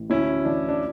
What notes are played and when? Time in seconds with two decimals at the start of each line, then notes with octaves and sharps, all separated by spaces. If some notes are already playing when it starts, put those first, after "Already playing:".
Already playing: A1
0.10 D2 C#4 E4
0.45 E3 D4
0.69 D4